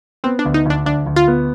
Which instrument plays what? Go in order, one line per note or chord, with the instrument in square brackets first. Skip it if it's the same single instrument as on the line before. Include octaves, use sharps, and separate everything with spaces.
[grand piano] B3 [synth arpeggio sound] C4
[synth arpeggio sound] D4
[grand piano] D2
[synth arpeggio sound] D#4
[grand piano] D2 [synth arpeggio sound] D4
[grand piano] D2 [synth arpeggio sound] D4
[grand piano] D2
[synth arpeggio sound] F4
[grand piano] B3